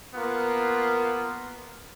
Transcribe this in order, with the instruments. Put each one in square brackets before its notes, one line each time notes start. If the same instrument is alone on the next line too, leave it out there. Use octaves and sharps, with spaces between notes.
[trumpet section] A#3 B3 F4